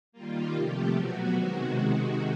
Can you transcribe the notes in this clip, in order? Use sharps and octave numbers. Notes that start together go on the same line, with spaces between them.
D#3 G3 A#3 F4
C3 F3 A3 G4
B2 F#3 B3 F#4
C3 D#3 G#3